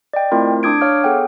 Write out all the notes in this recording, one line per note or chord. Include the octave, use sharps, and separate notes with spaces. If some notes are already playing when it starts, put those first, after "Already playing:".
D5 D#5 G5
A3 C4 E4 F4 A#4
D4 D6 D#6 G#6 D7
C#5 F5 D6 F6
B3 G#4 A4 F#5 G5